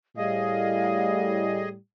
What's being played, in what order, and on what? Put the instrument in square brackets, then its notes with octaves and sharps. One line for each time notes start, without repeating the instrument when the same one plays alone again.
[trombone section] A2 G3 [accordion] G#4 D#5 [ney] F5